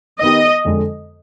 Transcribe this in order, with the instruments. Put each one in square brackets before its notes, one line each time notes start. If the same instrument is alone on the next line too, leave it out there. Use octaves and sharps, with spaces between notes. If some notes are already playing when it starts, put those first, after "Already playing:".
[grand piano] D#3 B3 D#4 G4 [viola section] D#5
[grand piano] F2 D3 G#3